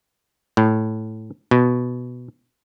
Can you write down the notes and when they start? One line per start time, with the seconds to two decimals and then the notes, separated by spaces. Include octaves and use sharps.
0.57 A2
1.51 B2